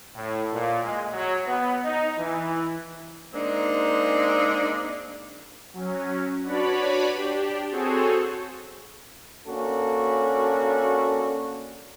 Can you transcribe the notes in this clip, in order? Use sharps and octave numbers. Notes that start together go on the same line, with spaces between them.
A2
A#2
G#3
F#3
B3
D#4
E3
G#3 A#3 C4 D4 D#4
F#3 C#4
D4 F#4 B4 C#5 D5 B5
D4 G4
C4 F#4 G#4 A4 C5 C#5
A#3 C#4 D4 F#4 A4